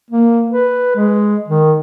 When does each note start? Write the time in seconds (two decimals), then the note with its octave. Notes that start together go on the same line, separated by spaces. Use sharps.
0.10 A#3
0.50 B4
0.96 G#3
1.48 D#3